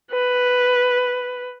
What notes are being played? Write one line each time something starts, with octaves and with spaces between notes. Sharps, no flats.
B4